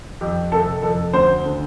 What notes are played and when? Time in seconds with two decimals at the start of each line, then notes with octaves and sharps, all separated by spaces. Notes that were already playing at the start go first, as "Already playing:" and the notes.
0.21 F2 G4
0.52 C3 A4
0.83 F2 A4
1.14 D2 C5
1.45 D3